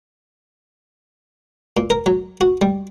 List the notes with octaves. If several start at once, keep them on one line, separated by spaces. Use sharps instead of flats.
A#2
A#4
F#3
F#4
G3